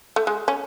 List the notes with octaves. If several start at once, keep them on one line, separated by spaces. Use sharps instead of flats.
A3
G#3
C#4